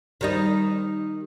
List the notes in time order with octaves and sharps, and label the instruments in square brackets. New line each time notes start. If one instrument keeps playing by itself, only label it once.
[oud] D#3 G3 D#4